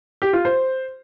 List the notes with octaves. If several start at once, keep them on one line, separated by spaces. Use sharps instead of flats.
G4
F4
C5